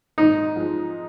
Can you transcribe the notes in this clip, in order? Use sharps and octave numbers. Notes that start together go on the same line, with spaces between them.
G#2 D#4
F3 G#3